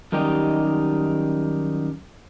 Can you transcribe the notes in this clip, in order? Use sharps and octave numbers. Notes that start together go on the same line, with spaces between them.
F#2 D#3 G3 D#4 G4